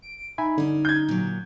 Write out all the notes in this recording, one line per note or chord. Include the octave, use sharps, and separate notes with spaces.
D7
D#4 E5 G#5 B5
D3 G3 C#4
G6 G#6
A#2 F#3